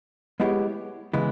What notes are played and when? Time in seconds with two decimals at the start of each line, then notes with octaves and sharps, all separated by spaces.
0.40 G#3 B3 E4 G4 C#5
1.13 C#3 E3 G#3 B3 E4